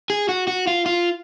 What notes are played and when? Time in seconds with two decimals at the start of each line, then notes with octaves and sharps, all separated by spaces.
0.10 G#4
0.29 F#4
0.48 F#4
0.67 F4
0.86 F4